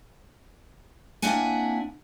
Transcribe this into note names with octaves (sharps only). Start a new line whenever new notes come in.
A#3 C4 D4 E4 F#5 G#5